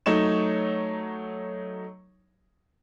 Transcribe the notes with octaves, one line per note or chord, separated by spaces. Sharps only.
F#3 A3 D#4 C#5 E7